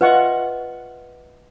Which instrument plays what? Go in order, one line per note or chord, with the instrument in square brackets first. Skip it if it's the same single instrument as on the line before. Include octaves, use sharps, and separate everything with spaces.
[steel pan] F4 F#5 C#6 [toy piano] B4 D#5 E5